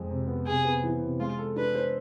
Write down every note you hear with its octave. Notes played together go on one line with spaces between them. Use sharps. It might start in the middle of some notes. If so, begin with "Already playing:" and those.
Already playing: F2 G#3
C3
B3
C3 G#4
B3
E3
C3
G#3 F4
A4
D4 B4
C5